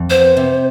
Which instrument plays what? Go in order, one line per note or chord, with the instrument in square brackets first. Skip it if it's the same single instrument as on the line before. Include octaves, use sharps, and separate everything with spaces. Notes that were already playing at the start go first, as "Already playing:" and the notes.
Already playing: [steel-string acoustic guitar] F2
[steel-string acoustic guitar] B3 [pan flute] C5
[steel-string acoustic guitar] C3